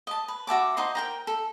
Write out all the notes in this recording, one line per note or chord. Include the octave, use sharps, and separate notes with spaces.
D#5 A5
B4
F#4 E5 A5 D6
D#4 C5 D#5 C6
A#4 G5 A#5
A4